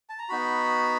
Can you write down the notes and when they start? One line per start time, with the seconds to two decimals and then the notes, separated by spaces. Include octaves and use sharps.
0.09 A5
0.19 A#5
0.29 B3 D#4 F#4 B5